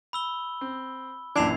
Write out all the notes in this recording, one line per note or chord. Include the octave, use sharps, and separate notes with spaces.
B5 E6 G7
C4
A#1 F#2 E3 D4 G#6 C7 F7